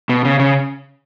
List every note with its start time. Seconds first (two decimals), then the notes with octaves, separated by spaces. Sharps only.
0.09 B2
0.25 C#3
0.40 C#3